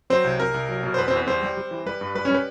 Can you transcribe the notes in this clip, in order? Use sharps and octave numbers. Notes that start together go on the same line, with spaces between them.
F#3 C4 C5
C2
C2 A#4
C2
F#3
B2
C5
E2 B4
C4 C5
E2 B4
G3 C4 C5
G3
G3
E3
G3 B4
G2
G3 B4
C#4 C#5
G3 B4